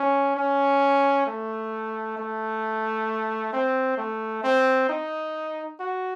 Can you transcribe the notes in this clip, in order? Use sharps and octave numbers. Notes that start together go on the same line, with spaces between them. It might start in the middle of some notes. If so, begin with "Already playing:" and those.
Already playing: C#4
C#4
A3
A3
C4
A3
C4
D#4
F#4